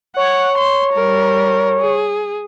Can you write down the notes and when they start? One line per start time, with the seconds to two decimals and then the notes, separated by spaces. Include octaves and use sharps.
0.16 C#5 F#5
0.58 C6
0.94 G3 A#4
1.80 G#4